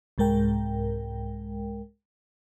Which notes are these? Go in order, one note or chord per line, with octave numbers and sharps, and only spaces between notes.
C2 G#2 G#3 A#4 G5